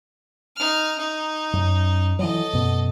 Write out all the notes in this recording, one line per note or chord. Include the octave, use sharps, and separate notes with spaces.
D#4 F6
D#4
F#2
E3 F#3 A4 D#5
F#2 B2